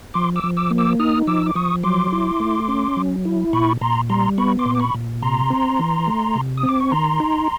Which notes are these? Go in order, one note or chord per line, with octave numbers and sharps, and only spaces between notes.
F3 C6 D6
D6 E6
F3
D6 E6
A#3
D6 E6
D#4 D#6 F6
F3 D6 E6
D6
F3 C#6 D#6
F#3 C6 D6
E4
A3
C#4
F#3
E4
A#2 B5 C#6
A#2 A#5 C6
G3 A#5 C6
B3 B5 C#6
C6 D6
A#2
D6
B5 C#6
A#2
C3 A#5 C6
C4
E3
A3
C3
D#6
C4
D6
C#6
D#3 A#5 C6
D#4